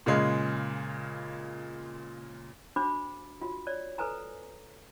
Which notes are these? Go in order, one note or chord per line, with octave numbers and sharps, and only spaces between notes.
A#2 C#3 G#3
D4 F#4 C5 B5 D6
F4 F#4
C#5 D5
A4 B4 C5 G#5 A#5